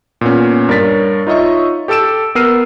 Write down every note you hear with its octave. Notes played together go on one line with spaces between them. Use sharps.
A#2 B3 C#4
G2 A#4 C#5 A6 B6
D#4 F4 C#5 D#5 E5 C#6
G4 A4 A5 E6 D7 E7
B3 A#4 E6 F6 C7 D#7